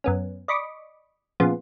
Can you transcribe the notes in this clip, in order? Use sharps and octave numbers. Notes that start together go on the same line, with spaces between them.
F#2 B3 C#4
D5 D#5 B5 C#6 D6
A#2 C#3 F3 B3 F4